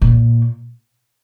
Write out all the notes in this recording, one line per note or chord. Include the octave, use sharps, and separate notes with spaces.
A#2